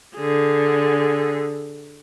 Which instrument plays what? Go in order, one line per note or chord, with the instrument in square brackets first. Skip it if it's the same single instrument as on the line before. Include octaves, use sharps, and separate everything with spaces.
[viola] D3 G#4